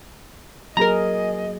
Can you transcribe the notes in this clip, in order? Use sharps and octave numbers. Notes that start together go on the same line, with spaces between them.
F#3 A#3 G#4 A#4 D#5 A#5